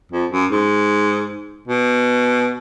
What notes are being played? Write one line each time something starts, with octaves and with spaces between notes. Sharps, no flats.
F2
F#2
G#2
B2